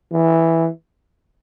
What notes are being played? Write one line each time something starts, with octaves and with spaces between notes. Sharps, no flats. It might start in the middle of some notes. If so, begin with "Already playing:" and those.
E3